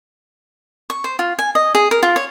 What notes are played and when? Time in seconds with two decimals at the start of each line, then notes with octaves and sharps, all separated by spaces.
0.90 C#6
1.04 C5
1.19 F4
1.39 G#5
1.55 D#5
1.75 G#4
1.91 A#4
2.03 F4
2.16 C#5